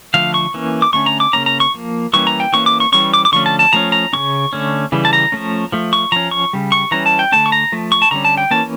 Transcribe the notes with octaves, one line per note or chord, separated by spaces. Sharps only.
D3 F3 A3 F5
C#6
E3 A#3 C#4
D6
D3 A3 C#4 C#6
A#5
D6
C#3 G3 A#3 C#4 A#5
A#5
C#6
F3 A#3
E3 G3 A#3 C#4 C#6
A#5
G5
E3 A#3 C#4 C#6
D6
C#6
E3 G3 C#4 C#6
D6
D6
D3 F3 A3 C#4 C#6
A5
A5
F3 A3 C#4 A#5
A#5
C#3 G3 C#4 C#6
D3 A3 C#4
C#3 E3 G3
A5
A#5
F3 A3 C#4
F3 A3
C#6
F3 C#4 A#5
C#6
C#3 G3
C#6
E3 G3 C#4 A#5
A5
G5
D3 A3 C#4 A5
C#6
A#5
F3 A3
C#6
A5
D3 G3 C#4 A#5
A5
G5
E3 A#3 C#4 A5